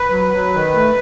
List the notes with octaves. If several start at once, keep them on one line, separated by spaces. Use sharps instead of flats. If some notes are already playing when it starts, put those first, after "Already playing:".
Already playing: B4
F#3
F#3
D#3
A3